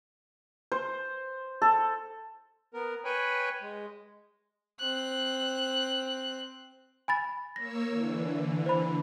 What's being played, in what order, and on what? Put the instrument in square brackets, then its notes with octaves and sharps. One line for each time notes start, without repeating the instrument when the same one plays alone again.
[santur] C5
A4
[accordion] B3 A#4
B4 C#5 G5 G#5 B5
G#3
[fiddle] C4 F#6
[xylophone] G#5 B5 A6
[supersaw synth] A#3 C#5 E6 [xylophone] A#6
[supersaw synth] D3 E3
[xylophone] C5 B5